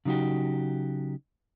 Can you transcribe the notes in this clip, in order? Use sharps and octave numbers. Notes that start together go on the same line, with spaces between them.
C#3 F#3 D#4 F#4 G4